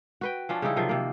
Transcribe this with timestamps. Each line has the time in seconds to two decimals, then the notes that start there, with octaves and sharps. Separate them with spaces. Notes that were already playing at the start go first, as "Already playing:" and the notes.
0.21 F#4 B4 G5
0.49 F3 C#4 D4
0.62 C#3 G3 D#4 E4
0.76 C3 D#3 F3 F#3
0.89 C3 A#3